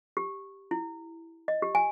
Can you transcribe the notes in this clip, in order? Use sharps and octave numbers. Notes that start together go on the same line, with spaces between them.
G4
E4
D#5
G4
G#5